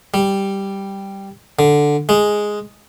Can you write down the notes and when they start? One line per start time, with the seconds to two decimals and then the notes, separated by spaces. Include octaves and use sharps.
0.14 G3
1.59 D3
2.09 G#3